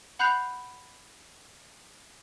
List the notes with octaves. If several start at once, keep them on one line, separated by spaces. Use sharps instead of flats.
F#5 B5 F#6 G6 C7 F7